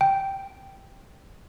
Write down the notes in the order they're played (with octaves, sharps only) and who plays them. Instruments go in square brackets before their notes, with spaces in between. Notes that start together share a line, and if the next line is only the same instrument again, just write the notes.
[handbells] G5